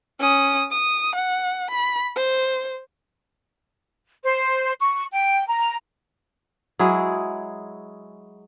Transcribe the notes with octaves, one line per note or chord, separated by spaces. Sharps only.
C#4 D#6
D#6
F#5
B5
C5
C5
C#6
G5
A#5
F#3 G#3 E4 G#4